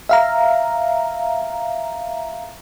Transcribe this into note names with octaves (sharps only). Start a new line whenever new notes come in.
E5 F5 A#5